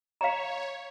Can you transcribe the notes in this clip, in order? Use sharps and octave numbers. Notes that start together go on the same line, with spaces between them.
C#5 F5 A#5